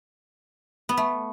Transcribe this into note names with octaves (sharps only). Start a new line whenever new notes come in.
B3
A3